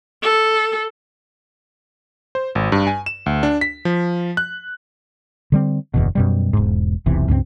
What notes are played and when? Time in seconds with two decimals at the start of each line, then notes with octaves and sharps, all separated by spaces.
0.22 A4
2.35 C5
2.55 G#1
2.72 G2
2.87 G#5
3.06 E7
3.26 D2
3.43 D4
3.61 B6
3.85 F3
4.37 F#6
5.52 D3 G3 C4
5.94 F#1 E2 B2
6.15 F#2 B2 G3
6.53 E1 G#2
7.06 E1 B1 C3 E3
7.28 C#2 G2 G3 C4